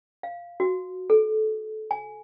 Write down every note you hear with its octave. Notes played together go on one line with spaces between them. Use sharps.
F5
F#4
A4
G#5